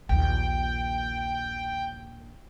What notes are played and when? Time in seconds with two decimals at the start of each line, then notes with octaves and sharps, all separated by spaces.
0.09 A#1 D#2 G5